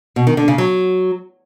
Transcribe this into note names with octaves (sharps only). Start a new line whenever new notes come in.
B2
D#3
D3
C#3
F#3